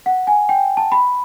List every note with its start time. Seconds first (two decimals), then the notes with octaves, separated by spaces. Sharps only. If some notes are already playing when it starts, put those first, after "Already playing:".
0.06 F#5
0.27 G#5
0.49 G5
0.77 A5
0.92 B5